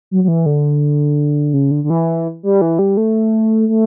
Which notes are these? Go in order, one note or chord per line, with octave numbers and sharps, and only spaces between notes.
F#3
F#3
E3
D3
C#3
D3
D3
E3
G3
E3
G3
A3
A3